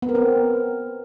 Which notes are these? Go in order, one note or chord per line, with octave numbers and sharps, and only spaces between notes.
B3
A#4
C4